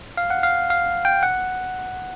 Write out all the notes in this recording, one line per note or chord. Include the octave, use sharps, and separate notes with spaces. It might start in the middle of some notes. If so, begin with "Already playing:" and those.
F5
F#5
F5
F5
G5
F#5